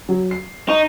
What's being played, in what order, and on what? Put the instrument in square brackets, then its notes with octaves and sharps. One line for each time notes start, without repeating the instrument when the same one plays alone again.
[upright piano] F#3
C7
[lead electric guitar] D#4 [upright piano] C#6